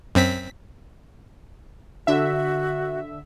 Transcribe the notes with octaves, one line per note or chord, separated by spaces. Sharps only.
F#2 C4 B6
D3 F#4 E5